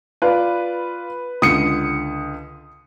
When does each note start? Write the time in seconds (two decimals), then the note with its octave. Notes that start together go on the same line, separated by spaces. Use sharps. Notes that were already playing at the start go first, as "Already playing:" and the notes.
0.22 F4 B4 D5
1.42 C#2 D3 D#6 C#7